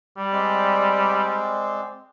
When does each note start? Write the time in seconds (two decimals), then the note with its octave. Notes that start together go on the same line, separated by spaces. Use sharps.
0.18 G3
0.32 G#3 C4 D5